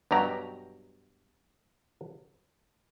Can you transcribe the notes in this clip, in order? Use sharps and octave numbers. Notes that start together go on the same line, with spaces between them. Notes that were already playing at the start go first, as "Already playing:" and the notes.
G2 B2 F#3 G4 A#5